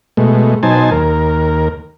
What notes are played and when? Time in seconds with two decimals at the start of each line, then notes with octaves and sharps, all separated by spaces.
0.17 B2 G#3 A3
0.63 B2 F#3 D#4 C5 G#5 A5
0.91 D#2 A#4